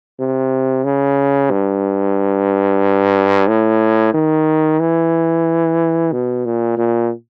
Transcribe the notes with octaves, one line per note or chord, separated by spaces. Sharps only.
C3
C#3
G2
A2
D#3
E3
B2
A#2
A#2